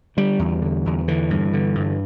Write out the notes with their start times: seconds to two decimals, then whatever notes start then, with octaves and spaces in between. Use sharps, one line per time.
0.17 D3 G3
0.39 E2
0.62 D3
0.86 E2
1.08 D3 E3
1.30 G2
1.53 D3
1.76 G2